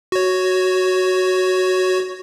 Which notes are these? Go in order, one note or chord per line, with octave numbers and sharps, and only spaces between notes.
F#4 C#5